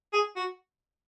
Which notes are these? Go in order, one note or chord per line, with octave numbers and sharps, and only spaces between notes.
G#4
F#4